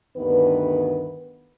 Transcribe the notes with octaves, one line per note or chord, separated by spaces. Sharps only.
D2 G2 D#3 B3 B4